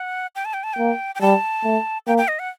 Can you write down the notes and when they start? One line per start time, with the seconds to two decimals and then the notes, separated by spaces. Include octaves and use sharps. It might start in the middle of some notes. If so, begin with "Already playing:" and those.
Already playing: F#5
0.35 G5
0.45 A5
0.54 G5
0.64 A5
0.74 A#3 G5
1.15 G5
1.21 G3 A5
1.64 A3
2.07 A#3 G5
2.18 G5
2.28 D#5
2.39 F#5